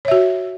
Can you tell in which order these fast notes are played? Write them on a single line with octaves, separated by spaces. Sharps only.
C#5 E5 F#4